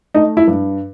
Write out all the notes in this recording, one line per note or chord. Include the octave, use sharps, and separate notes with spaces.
A3 D#4
E4
G2